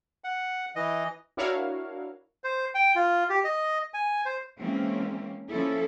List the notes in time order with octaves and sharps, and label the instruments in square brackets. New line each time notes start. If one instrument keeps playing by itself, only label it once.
[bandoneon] F#5
E3 D#5
[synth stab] D4 E4 F#4 A#4 C#5 F5
[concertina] C5
G5
F4
G4
D#5
G#5
C5
[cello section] E3 G#3 A#3 C4 C#4
F3 A#3 C#4 E4 A4